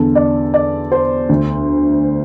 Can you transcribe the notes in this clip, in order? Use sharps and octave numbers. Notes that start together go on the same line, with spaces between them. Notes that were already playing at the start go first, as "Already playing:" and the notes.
Already playing: E2 D3 A4
D5
D5
C5
D2 D3